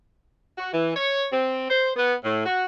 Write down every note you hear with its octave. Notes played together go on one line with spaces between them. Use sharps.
F#4
E3
C#5
C4
C5
B3
A2
F#4